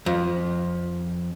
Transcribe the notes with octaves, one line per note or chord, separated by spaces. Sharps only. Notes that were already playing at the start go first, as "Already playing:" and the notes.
F2